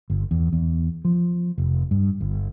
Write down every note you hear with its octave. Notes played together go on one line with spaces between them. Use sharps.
G1
E2
E2
F3
F1
G2
G1